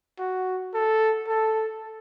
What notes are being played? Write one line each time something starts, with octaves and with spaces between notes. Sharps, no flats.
F#4
A4
A4